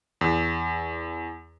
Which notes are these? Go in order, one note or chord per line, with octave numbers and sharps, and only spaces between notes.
E2